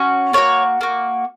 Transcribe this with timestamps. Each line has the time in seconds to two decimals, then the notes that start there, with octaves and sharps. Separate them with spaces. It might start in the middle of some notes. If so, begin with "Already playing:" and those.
Already playing: C#4 F#4
0.33 A#3 D#4 F#4 C#5
0.81 A#3 F#4